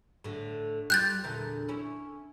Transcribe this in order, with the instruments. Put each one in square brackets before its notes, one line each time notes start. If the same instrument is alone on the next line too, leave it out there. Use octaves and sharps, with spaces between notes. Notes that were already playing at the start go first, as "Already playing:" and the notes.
[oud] A2 D3
[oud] G3 F4 [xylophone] F#6 G6 A6
[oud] E2 A#2 D3
C#4 E4